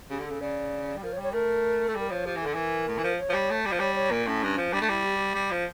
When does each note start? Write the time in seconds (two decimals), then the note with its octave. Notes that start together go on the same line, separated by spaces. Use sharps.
0.10 C#3 G4
0.19 D3
0.26 C#3 A4
0.40 C#3 D5
0.96 G3
1.03 F3 A#4
1.13 C#5
1.18 G3
1.23 C#5
1.33 A3 A#4
1.88 A3 A4
1.95 G3 A#4
2.10 F3 C#5
2.26 F3 G4
2.36 E3
2.42 D3 A4
2.54 E3 A#4
2.88 A2
2.98 E3
3.03 F3
3.19 C#5
3.29 F3
3.34 G3
3.50 A3
3.66 G3
3.71 F3
3.79 G3 C#5
3.95 C#5
4.11 A#2 A#4
4.26 A2 C#4
4.43 G2
4.57 F3
4.73 G3 D4
4.82 A3
4.89 G3 E4
5.05 G4
5.19 G4
5.35 G3
5.51 F3